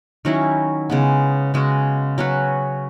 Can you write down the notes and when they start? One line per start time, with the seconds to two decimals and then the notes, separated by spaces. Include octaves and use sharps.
0.25 D#3 F#3 C#4 E4
0.90 C#3 G#3 B3
1.54 C#3 G#3 C#4 F#4
2.18 F#3 C#4 F#4 B4